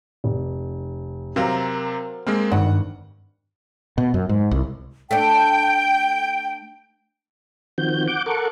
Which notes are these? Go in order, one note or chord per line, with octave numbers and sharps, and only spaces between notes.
F1
C3 F#3 C4 A#4 C5 F5
G#3 A#3 C4 F6
G#1 G2 F#5
B2
F#2
G#2
C2
A3 D4 G5
D#3 F3 C4 F#4 G6
F#5 D6 G6
A4 A#4 F#5 C#6 D6